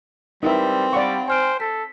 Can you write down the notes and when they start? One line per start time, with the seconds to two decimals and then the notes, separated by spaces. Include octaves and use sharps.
0.43 G3 C4 D#4 E4 A#4 B4 E5
0.93 G3 D5 F5 F#5 B5 C#6
1.28 C5 G#5 F6 D7
1.60 A4 B6